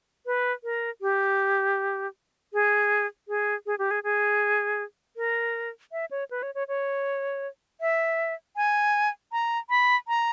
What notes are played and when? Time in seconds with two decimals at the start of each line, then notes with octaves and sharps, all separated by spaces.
0.26 B4
0.64 A#4
1.01 G4
2.53 G#4
3.28 G#4
3.66 G#4
3.79 G4
3.91 G#4
4.04 G#4
5.17 A#4
5.92 E5
6.11 C#5
6.31 B4
6.43 C#5
6.55 C#5
6.68 C#5
7.81 E5
8.56 G#5
9.32 A#5
9.70 B5
10.08 A#5